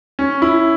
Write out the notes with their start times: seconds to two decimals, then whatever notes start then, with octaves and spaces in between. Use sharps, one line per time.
0.19 C#4
0.42 E4